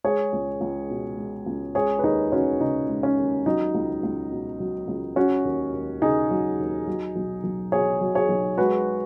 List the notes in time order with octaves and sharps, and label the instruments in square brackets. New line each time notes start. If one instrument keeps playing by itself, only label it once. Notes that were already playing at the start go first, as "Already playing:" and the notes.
[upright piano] G#3 G#4 C#5
C#2
C#2
B2
G#3
C#2
G#3 G#4 C#5
B4
D#2 D#4 G#4
D#2 C#4 F#4
C#3 D#4
G#3
C#4
D#2
F#3 D#4
C#2
C#2
B2
F#3
C#2
F#3 C#4 F#4
D#2
D#2
C#3 D#4 G#4
F#3
D#2
F#3
B1
B1
B2 G#4 C#5
F#3
G#4 C#5
B1
G#3 F#4 B4